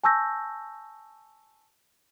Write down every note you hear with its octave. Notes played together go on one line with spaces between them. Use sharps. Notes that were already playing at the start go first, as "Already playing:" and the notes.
G#5 A5 C#6 E6 G6 A#6